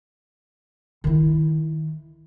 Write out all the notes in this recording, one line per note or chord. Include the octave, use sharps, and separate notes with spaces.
D#3 E4